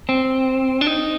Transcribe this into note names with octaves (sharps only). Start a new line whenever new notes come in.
C4
D4
D#4